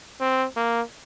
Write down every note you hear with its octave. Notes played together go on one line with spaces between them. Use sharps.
C4
A#3